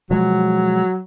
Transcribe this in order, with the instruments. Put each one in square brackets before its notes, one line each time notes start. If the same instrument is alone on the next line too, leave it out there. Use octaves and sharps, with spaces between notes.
[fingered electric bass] B2 F3 G#3 [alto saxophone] F#3